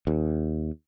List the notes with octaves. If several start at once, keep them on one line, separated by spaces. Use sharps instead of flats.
D#2